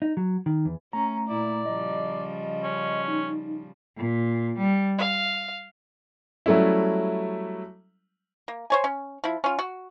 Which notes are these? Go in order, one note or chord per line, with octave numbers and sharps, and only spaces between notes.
D#4
F#3
D#3
E2
A3 C#4 A#5
A#2 E4 D5
C#3 F3 G3 D#5
C#4
D#4
A#2
G3
F5
F#3 G3 A3 C#4 E4
A#3
C5 C#5 G#5
C#4
F3 E4
C#4 F4
F#4